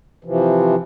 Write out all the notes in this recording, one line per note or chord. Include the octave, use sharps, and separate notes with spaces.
C3 E3 F3